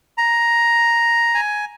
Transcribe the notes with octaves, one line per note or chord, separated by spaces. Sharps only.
A#5
G#5